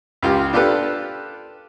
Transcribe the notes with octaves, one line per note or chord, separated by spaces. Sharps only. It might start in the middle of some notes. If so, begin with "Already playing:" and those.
C#2 F4 G4
D4 F4 G4 A4 B4